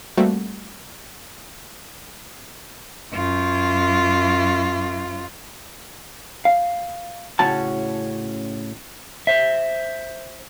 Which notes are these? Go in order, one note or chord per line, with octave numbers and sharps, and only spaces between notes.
G3 A3 A#3 C4 F#4
F#2 F4
F5
A2 C#3 C#4 F#4 A5
C5 E5